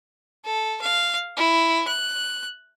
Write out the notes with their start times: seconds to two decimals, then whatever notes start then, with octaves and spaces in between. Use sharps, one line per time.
0.45 A4
0.81 F5
1.37 E4
1.88 F#6